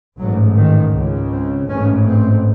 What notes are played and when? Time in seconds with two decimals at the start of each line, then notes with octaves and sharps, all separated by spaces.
0.18 A1 G#2 F#3
0.56 D#3
0.93 C#2 C#3
1.31 C4
1.69 A1 G#2 C#4
2.07 C4